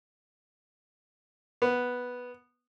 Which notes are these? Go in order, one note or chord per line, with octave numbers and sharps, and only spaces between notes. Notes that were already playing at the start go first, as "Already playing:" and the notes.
B3